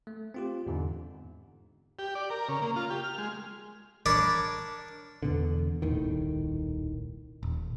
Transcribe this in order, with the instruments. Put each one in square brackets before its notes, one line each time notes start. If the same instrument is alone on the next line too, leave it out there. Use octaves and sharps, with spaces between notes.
[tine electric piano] A3
C4 F4 G4
E2 G#2 D3
[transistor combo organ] G4
D5
A#4
C#3
A#3
F4
G4
F6
G#3
[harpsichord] D4 A#4 C#5 D5 B5 D6
[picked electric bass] E2 B2 D3
D#1 C2 A2 D#3
D#1